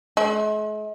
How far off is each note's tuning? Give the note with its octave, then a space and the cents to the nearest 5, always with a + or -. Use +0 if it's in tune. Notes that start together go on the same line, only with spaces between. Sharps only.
G#3 +45